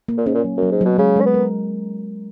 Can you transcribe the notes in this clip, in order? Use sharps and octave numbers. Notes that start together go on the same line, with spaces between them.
A#3
A#2
G#2 C#4
A#2
F#3
F#2
F#3
G#2
B2 F#3
C#3 G#3
G#3 C#4
B3
A#4